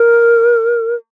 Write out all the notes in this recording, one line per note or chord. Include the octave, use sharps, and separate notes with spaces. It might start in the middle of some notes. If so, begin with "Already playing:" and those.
Already playing: A#4